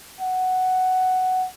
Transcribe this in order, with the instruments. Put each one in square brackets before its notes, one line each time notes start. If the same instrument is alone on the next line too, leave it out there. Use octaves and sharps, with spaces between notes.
[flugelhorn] F#5